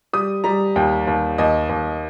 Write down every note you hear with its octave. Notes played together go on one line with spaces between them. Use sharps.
G3 D#6
G3 A#5
D#2 G5
D#2
D#2 D#5
D#2